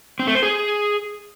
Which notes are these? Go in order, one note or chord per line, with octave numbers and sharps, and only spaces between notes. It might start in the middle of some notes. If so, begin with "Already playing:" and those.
C4
A3
C5
G#4